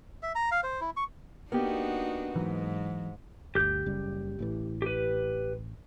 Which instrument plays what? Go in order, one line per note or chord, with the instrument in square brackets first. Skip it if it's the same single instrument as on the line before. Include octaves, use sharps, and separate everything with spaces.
[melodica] E5
A#5
F5
C5
E4
C#6
[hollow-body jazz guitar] A#3 G4 [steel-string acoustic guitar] B3 [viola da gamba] D4 D#4 F#4
[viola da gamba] G#2 [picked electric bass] E3 F#3
[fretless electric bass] G1 D2 [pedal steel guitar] G4 G6
[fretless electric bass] F#1 C#3 G3
A1 A2 E3
[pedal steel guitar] G4 B4